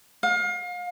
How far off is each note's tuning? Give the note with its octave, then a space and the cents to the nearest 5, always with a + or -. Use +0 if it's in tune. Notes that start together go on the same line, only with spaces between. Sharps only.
F5 +35